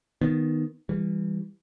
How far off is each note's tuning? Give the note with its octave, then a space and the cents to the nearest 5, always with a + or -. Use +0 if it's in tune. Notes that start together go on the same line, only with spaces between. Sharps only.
D#3 +0 B3 +0
E3 +0 G3 +20